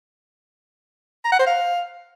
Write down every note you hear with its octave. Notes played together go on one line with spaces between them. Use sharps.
A#5
F#5
C5
F5